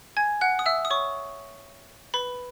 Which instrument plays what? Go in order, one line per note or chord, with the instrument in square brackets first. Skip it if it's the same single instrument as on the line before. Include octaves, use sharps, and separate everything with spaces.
[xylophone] G#5 G#6
F#5 F#6
D#6
E5 E6
D#6
C#5 C#6
B4 B5